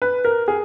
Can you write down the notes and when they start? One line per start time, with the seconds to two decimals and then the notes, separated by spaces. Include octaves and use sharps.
0.02 B4
0.25 A#4
0.48 G#4